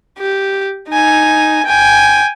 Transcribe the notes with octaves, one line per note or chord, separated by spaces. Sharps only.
G4
D#4 G#5
G5 G#5